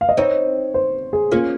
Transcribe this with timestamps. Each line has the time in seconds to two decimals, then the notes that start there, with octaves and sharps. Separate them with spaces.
0.01 F5
0.09 D#5
0.17 C4 D#4 C#5
0.74 C5
1.13 G#4
1.31 A#3 C#4 F4